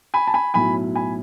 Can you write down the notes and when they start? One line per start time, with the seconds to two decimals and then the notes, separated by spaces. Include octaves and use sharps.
0.14 G#5 B5
0.27 A5
0.34 G#5 B5
0.54 B1 A2 F#3 G#5 B5
0.96 G#5 B5